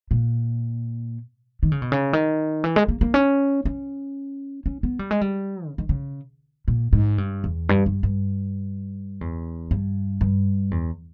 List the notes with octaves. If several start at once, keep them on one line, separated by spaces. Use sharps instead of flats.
A#2
D#3
C#3
B2
C#3
D#3
E3
G#3
A#3
A#3
C#4
C#4
C#4
B3
G3
G#3
G3
C#3
D#3
C#3
A#2
G#2
G2
E2
G2
G2
G2
E2
G2
G2
E2